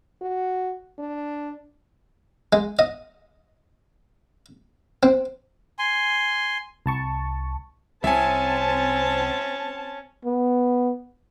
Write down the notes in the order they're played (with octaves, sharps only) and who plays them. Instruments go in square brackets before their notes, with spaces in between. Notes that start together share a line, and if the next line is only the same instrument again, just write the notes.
[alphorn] F#4
D4
[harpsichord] G#3
D#5
C4
[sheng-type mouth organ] G#5 C6
[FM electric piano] C2 A5 C#6
[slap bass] C2 C3 [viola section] C4 A5 [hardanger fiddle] C#4 [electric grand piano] E5 G#5
[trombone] B3